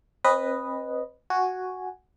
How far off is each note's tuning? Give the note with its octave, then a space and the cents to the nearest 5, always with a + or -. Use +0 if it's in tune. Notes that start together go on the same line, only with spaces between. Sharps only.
C4 +35 B4 +0 D#5 -5
F#4 +0 G#5 +0